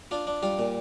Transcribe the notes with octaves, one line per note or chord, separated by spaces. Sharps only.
D4 F4
D4
G3 F4
A#2